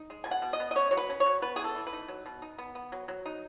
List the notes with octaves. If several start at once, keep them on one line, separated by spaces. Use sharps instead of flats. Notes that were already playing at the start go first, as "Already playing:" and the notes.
Already playing: D#4
G#3
B2 G#5
F#5
B2
D#5
B3
D#5
C#4 C#5
F#3 C#5
B4
C#4
C#5
F#3
B3 B4
E3 G#4
A4
E3
B4
D#4
F#3
B2
D#4
B3
B3
F#3
F#3
D#4